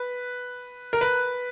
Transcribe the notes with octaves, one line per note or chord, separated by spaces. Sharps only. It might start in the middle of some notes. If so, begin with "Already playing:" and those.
Already playing: B4
A#4
B4